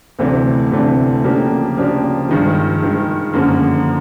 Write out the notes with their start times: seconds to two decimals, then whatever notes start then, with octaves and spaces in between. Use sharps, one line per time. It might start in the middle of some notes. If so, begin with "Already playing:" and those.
0.19 D2 C3 E3 A3 D4
0.71 D2 C3 E3 A3 D4
1.24 C#3 F3 A#3 D4 G4
1.77 C#3 F3 A#3 D4 G4
2.29 G2 D#3 G#3
2.81 G2 D#3 G#3
3.34 F#2 D3 F3 A#3